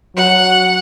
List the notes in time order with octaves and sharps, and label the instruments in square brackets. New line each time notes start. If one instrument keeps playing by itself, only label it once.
[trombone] F#3 [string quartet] F#5